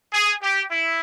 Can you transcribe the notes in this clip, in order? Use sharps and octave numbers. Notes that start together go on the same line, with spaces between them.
G#4
G4
E4